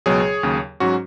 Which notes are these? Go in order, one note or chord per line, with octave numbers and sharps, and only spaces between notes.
C#2 B2 F#3 G#4 C#5
D#2 C#3 F#3
G#2 F#3 C#4 F#4